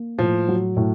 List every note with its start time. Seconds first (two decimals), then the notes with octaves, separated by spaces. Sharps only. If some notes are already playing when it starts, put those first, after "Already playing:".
Already playing: A#3
0.19 A2 F3
0.48 F#3
0.77 A2